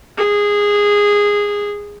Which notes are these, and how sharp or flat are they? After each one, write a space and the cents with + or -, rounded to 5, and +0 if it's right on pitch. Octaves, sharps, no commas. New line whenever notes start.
G#4 -15